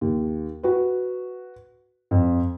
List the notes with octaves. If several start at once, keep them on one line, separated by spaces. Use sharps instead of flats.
D#2
F#4 B4
F2